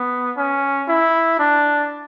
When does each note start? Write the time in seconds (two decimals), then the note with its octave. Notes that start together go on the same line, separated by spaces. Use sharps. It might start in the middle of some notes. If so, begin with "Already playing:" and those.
Already playing: B3
0.37 C#4
0.89 E4
1.39 D4